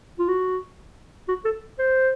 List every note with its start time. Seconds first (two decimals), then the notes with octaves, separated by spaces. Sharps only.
0.19 F4
0.28 F#4
1.28 F#4
1.45 A4
1.79 C5